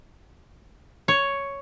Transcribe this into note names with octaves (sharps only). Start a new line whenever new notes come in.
C#5